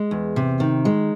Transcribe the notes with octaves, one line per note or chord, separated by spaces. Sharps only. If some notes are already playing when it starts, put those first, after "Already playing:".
Already playing: G#3
E2
C3
D#3
G#3